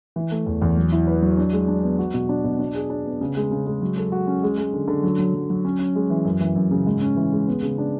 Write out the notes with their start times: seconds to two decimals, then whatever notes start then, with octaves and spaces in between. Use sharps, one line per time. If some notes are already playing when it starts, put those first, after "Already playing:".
0.16 E3
0.31 A3
0.46 E2
0.62 E2
0.77 F#3
0.92 E4
1.07 B4
1.22 F#3
1.38 D4
1.53 G#3
1.68 D4
1.83 B3
1.99 F#4
2.14 B2
2.29 D4
2.44 B2
2.59 D4
2.74 G#4
2.90 D4
3.05 B3
3.21 C#3
3.36 G#3
3.51 C#3
3.66 G#3
3.81 F#3
3.97 A4
4.12 F#4
4.27 C#4
4.43 G#3
4.57 G#3
4.73 D3
4.88 D3
5.03 F#3
5.19 F#3
5.34 F#3
5.50 F#3
5.65 C#4
5.79 C#4
5.95 G#3
6.10 E3
6.25 F#2
6.40 E3
6.56 F#2
6.71 C#3
6.87 G#2
7.02 C#4
7.16 E3
7.32 G#3
7.48 B3
7.63 C#3
7.78 D4